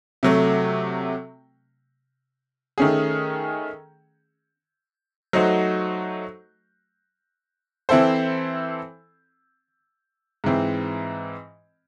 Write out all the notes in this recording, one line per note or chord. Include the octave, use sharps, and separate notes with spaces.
C3 F#3 A3
D#3 A3 C#4 G#4
F#3 A3 D#4 F#4 C5
E3 C4 E4 A4 C5
G#2 E3 C4